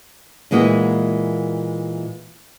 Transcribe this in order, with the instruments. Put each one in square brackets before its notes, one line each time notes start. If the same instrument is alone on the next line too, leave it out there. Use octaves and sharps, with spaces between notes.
[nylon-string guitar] A#2 E3 G#3 A#3 F#4